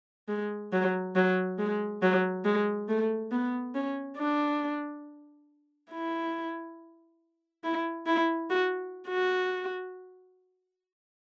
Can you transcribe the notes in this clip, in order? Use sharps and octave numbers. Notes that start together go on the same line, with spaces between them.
G#3
F#3
F#3
G#3
F#3
G#3
A3
B3
C#4
D4
E4
E4
E4
F#4
F#4